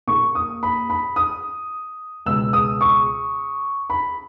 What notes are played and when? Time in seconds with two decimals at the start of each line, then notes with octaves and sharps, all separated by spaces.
0.07 A#2 A#3 C#6
0.35 D#6
0.63 B5
0.90 B5
1.16 D#6
2.26 C#2 B2 G#3 B3 E6
2.53 D#6
2.81 C#6
3.90 B5